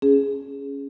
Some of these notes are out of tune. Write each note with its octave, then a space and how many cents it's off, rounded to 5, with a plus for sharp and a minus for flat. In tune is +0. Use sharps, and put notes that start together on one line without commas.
C#4 +0 G#4 +0